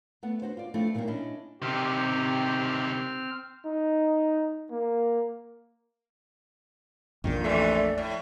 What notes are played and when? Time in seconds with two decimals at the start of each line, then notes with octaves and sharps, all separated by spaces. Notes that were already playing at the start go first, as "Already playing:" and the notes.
0.23 A3 B3 F#5
0.42 D4 D#4 F#4 C5
0.57 F4 D5
0.74 F3 A3 C4 D4 E4 F4
0.95 A#2 D#3 F#3 G3 A#3
1.07 C#4 D4 E4 D#5
1.62 C3 D#3 C4 G4 F6
3.65 D#4
4.70 A#3
7.24 A#1 F2 A#2 D#3
7.44 F#2 C3 E3 A3 D5
7.98 A2